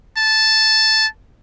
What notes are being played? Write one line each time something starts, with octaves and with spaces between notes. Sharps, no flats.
A5